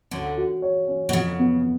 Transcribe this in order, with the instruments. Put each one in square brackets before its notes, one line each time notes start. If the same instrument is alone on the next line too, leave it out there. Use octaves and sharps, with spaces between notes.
[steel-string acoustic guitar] D2 D3 [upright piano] C#4
[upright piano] F#4
C#5
C#4
[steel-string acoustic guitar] B2
[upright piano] F2 [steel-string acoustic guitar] C#3
[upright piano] B3